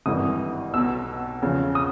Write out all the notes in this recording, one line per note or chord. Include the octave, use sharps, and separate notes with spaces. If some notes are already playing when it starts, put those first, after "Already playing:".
G#1 G2 E3 D#6
B1 B2 E6
E2 C#3 F3
D#6